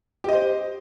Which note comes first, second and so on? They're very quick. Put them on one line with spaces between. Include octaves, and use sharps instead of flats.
G4 D#5 C5